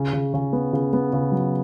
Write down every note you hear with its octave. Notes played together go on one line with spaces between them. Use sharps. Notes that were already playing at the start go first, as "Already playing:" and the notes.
Already playing: C#3
C#3
C#3
B3
C#3
B3
C#3
F#3